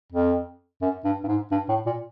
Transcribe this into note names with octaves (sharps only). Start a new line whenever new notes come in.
F2
F#2
G2
G2
G#2
G2
A2
A#2